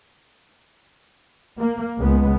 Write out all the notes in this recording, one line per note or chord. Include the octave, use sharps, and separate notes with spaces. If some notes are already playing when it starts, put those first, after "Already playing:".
A#3
C#2 G#3 B3